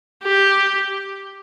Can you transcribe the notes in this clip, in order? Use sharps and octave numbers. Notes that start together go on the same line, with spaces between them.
G4